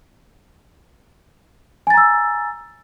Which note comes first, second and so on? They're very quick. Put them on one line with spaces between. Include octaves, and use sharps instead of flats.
G#5 A6 A#5 E6